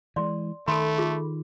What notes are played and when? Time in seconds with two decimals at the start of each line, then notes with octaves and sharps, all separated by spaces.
0.16 E3 G#3 D5 C6
0.68 D#3 A3 A4 B5 C6
0.98 F4 G#4